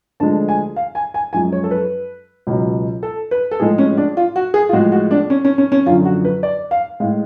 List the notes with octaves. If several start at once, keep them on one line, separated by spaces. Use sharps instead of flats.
D2 D3 F3 G#3 A5
G#5
F5
G#5
G#5
F#2 F3 G#3 G#5
C#5
A4
B4
C#2 B2 F#3
A4
B4
A4
A2 F3 G#3 G#4
C#4
D4
F4
F#4
G#4
F4
A2 F3 G#3 F#4
F#4
D4
C#4
C#4
C#4
C#4
F#2 D3 F3 F4
F#4
B4
D5
F5
A2 G#3 F5